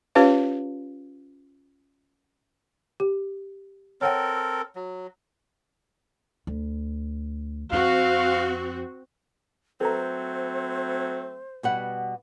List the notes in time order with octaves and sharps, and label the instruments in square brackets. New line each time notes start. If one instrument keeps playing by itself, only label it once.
[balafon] C#4 F4 G4 B4 C#5 F5
G4
[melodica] C4 A4 A#4 [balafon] C#5 F#5 G5
[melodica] F#3
[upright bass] D2
[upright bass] F2 [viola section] C4 F#4 [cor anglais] F5
[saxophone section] F#3 A3 C4 [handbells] A4 B4 A#5 [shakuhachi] C5
[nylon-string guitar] B2 G3 F#5